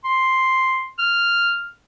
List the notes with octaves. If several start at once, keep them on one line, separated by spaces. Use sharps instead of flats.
C6
F6